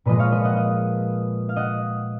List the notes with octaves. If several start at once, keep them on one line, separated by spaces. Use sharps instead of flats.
A#2 F3 G#3 B4 D#5
C#5 F5
B4 D#5
D#5 F#5
D#5 F#5
F5
D#5 F#5